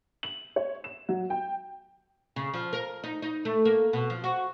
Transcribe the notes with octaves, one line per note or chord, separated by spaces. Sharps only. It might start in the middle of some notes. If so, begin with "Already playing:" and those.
F#7
C#5
E7
F#3
G5
C#3
F3
A#4
D#4
D#4
A3
A#3
B2
F3
F#4